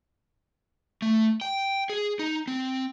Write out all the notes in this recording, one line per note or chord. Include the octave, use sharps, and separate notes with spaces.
A3
G5
G#4
D#4
C4